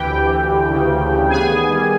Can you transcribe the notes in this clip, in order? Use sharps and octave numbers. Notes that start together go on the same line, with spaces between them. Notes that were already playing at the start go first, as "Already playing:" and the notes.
Already playing: D2 E3 G4 G5
D2
E3
D2
C#3
D2
C#3
B3 G#4 G#5
D#3
G3